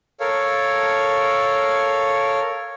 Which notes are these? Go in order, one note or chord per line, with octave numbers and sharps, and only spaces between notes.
A4 A#4 C#5 F5